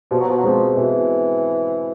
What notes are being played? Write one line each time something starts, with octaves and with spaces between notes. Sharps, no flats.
B2 F3
F#3
F3
F#3
F3 G#3 C4
B2 E3